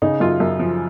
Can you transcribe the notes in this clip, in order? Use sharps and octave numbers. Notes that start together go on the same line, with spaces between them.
C#3 D#4
F#2 F4
F#2
F3